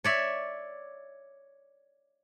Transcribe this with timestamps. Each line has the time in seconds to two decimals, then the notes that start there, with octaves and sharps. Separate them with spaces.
0.04 C#5 D5 E5